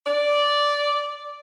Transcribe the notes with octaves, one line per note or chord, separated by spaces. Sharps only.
D5